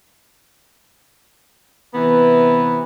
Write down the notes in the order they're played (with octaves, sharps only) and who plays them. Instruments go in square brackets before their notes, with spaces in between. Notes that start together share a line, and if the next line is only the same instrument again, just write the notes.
[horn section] C3 E3 B3 A#5